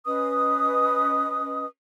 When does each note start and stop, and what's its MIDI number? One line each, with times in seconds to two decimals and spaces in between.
0.06 1.66 61
0.06 1.66 71
0.06 1.66 75
0.06 1.66 87